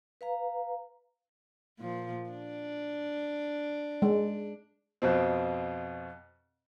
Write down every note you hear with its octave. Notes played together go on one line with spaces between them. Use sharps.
B4 F5 A#5
A#2 F3
D4
G#3
F2 B2 C4